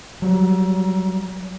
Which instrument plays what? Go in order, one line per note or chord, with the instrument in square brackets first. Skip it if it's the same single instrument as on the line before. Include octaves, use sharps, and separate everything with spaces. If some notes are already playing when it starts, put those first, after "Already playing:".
[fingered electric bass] F#3 G3